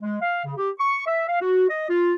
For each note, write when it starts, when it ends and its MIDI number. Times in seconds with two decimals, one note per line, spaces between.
0.02 0.17 56
0.22 0.43 77
0.45 0.53 49
0.57 0.70 67
0.79 1.05 85
1.06 1.26 76
1.28 1.37 77
1.41 1.69 66
1.69 1.85 75
1.89 2.14 65